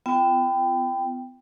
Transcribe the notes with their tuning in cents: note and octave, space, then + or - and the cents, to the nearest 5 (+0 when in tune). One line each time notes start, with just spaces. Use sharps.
B3 +35 F4 -30 G5 +0